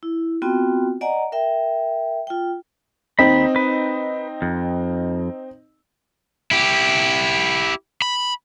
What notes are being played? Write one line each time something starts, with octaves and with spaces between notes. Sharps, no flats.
E4
B3 C4 F4 F#4 G5
D5 D#5 F#5 G#5 A#5
A#4 E5 G5
F4 G5
D#2 C4 D#4 B5
B4
F2
E4 G4
B5